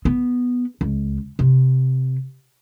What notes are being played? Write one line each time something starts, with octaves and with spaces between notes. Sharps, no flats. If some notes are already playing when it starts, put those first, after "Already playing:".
B3
C#2
C3